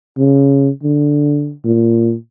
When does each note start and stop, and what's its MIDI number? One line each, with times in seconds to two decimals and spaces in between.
0.18 0.69 49
0.83 1.53 50
1.65 2.14 46